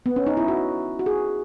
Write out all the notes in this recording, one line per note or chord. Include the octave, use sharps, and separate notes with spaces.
B3
C#4
D#4
E4
F#4
F#4
G#4